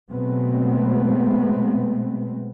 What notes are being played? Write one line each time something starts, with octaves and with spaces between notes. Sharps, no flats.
B2 F#3 G#3 A3 B3 C4